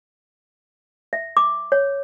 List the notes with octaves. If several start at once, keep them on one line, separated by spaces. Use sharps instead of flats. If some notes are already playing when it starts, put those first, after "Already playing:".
E5
D6
C#5